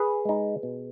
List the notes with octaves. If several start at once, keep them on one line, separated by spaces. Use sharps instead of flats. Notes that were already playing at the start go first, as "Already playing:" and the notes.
Already playing: G#4 B4
G#3 D#4
B2